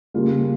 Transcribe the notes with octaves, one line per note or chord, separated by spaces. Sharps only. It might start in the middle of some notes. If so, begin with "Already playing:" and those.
C#3 G3 A#3 F4